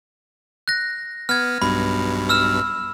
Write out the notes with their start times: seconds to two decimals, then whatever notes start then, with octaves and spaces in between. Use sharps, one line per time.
0.68 F#6 A#6
1.29 B3 F6 G#6
1.62 B1 G2 B2 B5
2.29 E6 F6 E7